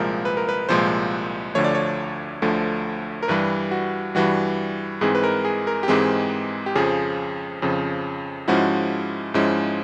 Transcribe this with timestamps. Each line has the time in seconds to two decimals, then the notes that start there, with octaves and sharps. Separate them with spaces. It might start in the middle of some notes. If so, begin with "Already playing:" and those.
Already playing: C2 A#2 F3 G#3 A#4
0.25 B4
0.37 A#4
0.49 B4
0.69 C2 A#2 F3 G#3 C5
1.55 D2 D3 F3 A3 C#5
1.64 D5
1.75 C#5
2.42 D2 D3 F3 A3
3.23 A#4
3.28 G2 E3 G3 B4
3.71 F#4
4.15 G2 E3 G3 F#4
5.01 G#2 E3 G#3 C4 G#4
5.15 B4
5.24 A#4
5.45 G#4
5.67 A#4
5.83 G4
5.88 G#2 E3 G#3 C4 G#4
6.66 G4
6.75 F2 C#3 F3 G#4
7.62 F2 C#3 F3
8.48 G#2 F3 G#3 C#4 E4 F#4
9.34 G#2 F3 G#3 C#4 E4